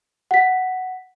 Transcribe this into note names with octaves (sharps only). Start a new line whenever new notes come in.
F#5 B6